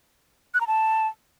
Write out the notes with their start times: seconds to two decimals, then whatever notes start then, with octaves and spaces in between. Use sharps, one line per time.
0.54 F#6
0.61 A#5
0.67 A5